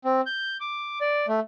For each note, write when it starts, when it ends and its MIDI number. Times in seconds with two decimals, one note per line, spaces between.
0.05 0.21 60
0.26 0.57 91
0.60 0.99 86
1.01 1.26 74
1.28 1.40 57